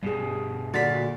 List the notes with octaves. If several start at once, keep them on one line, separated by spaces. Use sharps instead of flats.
G2 B2 G3 G#4
D2 A#2 D3 F#4 A6 B6